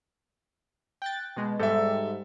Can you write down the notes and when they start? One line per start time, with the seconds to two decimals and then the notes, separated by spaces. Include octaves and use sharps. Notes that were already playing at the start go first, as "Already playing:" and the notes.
1.02 G5 F#6 A6
1.37 B2 G#3
1.59 G#2 G3 A4 E5